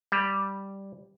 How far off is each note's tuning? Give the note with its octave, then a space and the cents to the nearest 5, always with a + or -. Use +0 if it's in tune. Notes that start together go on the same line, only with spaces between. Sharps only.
G3 +0